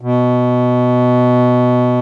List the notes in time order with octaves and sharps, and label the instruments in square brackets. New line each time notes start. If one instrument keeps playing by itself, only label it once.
[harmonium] B2